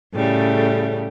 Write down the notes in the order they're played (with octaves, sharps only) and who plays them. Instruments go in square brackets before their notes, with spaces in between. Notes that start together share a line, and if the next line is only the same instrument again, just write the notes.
[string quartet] A2 C#3 G3 A3